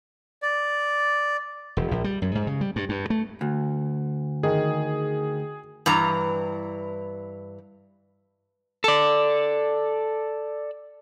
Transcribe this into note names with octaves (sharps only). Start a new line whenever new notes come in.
D5
E1
A#1
G3
F#2
G#2
C#3
G3
G2
G2
A3
D2
D#3 G#4
G2 E3 A#5
A4 D5